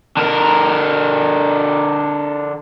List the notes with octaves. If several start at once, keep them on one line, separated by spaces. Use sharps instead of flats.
D3 A#4